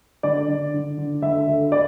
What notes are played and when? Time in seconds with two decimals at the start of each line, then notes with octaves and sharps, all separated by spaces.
0.23 D3 D5
0.48 D3
0.74 D3
0.97 D3
1.22 D3 E5
1.47 D2
1.72 D5